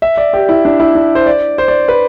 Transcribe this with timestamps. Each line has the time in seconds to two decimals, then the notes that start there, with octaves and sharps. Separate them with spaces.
0.02 E5
0.17 D5
0.33 G4
0.49 E4
0.65 D4
0.80 E4
0.95 D4
1.15 C5
1.26 D5
1.58 C5
1.68 D5
1.88 B4